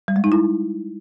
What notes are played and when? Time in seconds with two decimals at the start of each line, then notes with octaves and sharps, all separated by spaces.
0.08 G3
0.16 G#3
0.24 D#4
0.32 E4